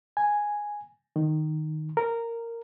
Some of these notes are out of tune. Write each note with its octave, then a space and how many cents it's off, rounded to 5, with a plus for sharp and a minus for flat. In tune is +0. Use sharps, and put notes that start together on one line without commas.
G#5 +0
D#3 -10
A#4 -10